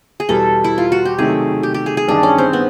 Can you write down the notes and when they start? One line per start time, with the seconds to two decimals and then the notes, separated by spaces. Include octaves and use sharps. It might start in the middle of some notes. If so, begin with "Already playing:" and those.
0.20 G#4
0.29 E2 B2 G3 A4
0.64 E4
0.78 F4
0.92 F#4
1.05 G4
1.18 C3 D#3 F#3 A3 G#4
1.63 G4
1.74 G4
1.86 G#4
1.97 G#4
2.08 A1 G2 D#3 D4
2.23 C#4
2.38 C4
2.53 B3